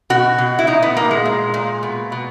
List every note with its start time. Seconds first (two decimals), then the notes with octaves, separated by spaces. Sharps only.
0.10 B2 F#4
0.39 B2
0.59 E4
0.67 A#2 D#4
0.83 B3
0.97 A#2 A#3
1.11 G#3
1.26 A#2
1.54 A#2
1.83 B2
2.12 B2